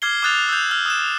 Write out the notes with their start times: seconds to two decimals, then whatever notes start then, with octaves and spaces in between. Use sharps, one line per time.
0.02 D6 F6 G#6 C7 G7
0.22 D6 D#6 F#6 A6 F7
0.49 E6 G6
0.71 F6
0.86 D#6 F#6 E7